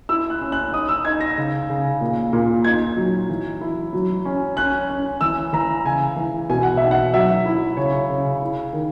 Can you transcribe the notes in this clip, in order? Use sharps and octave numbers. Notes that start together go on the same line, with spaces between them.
E4 E6
F#6
C#4
F#6
D#4 D#6
E6
D#4 G#6
A#6
C#3
C#3
A#2
A#2
D#4 G#6
F#3
E3
E4
F#3
C#4
C#4 F#6
C#4
E3 E6
E3 A#5
C#3 G#5
E3
B2 G#5
F#5
D#4 E5
F#5
F#3 E5
E4
C#3 C#5
C#3
E4
D#3